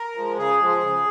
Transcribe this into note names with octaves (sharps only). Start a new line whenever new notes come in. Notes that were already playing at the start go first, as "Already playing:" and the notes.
Already playing: A#4
F3 G#3
C#3 G#4
F3 G#3
C#3